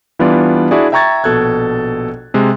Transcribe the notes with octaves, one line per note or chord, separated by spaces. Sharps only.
E3 G3 B3 D4 F4 D5
D4 E4 F#4 G#4 D5
E5 G5 A#5 C#6 G#6 A6
A#1 B2 A4 F#6 G#6
C3 G#3